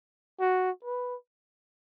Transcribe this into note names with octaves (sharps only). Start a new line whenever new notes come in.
F#4
B4